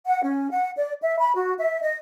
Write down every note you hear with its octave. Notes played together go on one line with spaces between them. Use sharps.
F#5
C#4
F#5
D5
E5
B5
F#4
E5
D#5